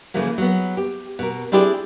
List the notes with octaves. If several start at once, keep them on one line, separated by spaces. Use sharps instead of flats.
C#3 E3 F3 A3 A#3
F#3 B3
G4
B2 A#4
C4 D4 E4 G4 G#4 D5